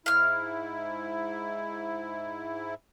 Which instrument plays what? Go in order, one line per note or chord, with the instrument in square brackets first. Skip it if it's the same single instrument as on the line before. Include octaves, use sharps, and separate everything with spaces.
[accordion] G#2 E4 [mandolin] F5 F6